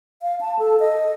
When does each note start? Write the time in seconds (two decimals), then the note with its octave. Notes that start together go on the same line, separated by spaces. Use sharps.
0.22 F5
0.41 A5
0.59 A4
0.80 D#5